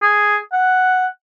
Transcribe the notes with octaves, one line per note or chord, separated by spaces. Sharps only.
G#4
F#5